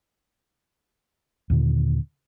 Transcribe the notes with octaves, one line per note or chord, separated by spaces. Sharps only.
D#2 A#2 D3